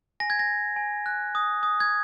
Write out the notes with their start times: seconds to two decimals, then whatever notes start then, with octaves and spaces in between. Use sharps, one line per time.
0.20 G#5 A#6
0.30 G#6
0.39 A#6
0.49 G#5
0.76 G#5
1.06 F#6
1.35 D#6
1.63 D#6
1.80 G#6